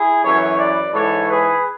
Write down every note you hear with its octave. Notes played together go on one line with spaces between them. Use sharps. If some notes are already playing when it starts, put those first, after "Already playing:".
Already playing: E4 G#4
F#2 E3 A4 C#5
B4 D5
G#2 E3 A4 C#5
G#4 B4